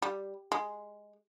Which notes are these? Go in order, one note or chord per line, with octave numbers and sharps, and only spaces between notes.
G3
G#3